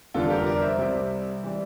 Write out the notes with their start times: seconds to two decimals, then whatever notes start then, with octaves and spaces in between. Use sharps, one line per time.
0.14 F1 E2 D3 G3 F4 A4
0.26 A4
0.30 G4 A#4
0.46 A#4 D5
0.62 C5 E5
0.78 C2 C3 G3
1.43 E3 G3